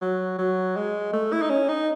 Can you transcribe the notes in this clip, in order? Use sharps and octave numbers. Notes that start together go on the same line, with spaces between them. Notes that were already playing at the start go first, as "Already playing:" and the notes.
F#3
F#3
G#3
A3
E4
D#4
C#4
D#4